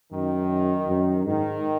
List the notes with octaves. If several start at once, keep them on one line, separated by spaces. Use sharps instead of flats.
F#2 D#3
F#2
G#2 D#3